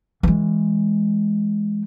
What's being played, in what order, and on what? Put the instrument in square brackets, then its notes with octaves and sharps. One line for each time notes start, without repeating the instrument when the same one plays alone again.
[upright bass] E3 G#3